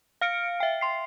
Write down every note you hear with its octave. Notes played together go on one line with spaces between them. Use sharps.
F5 F6 C#7 D7
E5 G5
C6 C7